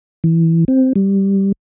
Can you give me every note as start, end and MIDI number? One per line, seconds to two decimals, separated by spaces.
0.24 0.65 52
0.68 0.93 60
0.96 1.52 55